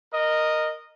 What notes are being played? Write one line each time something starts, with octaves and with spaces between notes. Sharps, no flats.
A#4 D#5